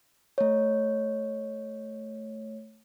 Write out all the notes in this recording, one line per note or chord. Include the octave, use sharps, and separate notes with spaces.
A3 C#5